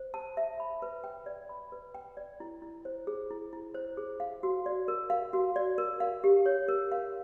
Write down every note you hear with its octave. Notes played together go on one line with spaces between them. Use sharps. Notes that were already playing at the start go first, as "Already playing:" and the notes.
Already playing: C5
A5
E5
B5
B4
G5
D5
B5
B4
G5
D5
E4
E4
C5
G#4
E4
E4
C5
G#4
F5
F#4
D5
A#4
F5
F#4
D5
A#4
F5
G4
C#5
A#4
F5